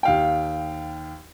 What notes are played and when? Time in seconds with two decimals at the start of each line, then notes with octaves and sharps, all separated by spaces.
0.03 D#2 F5 G5